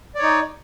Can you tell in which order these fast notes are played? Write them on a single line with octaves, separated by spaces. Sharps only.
D5 C#5 D#4